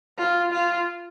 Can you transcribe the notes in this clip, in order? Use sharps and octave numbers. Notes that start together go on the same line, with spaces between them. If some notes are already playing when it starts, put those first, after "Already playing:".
F4
F4